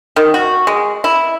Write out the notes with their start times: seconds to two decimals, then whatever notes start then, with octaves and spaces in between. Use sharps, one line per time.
0.16 D#3
0.34 F#4
0.67 G#3
1.04 E4